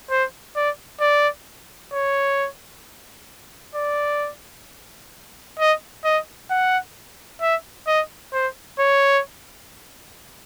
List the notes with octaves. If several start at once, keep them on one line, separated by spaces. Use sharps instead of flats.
C5
D5
D5
C#5
D5
D#5
D#5
F#5
E5
D#5
C5
C#5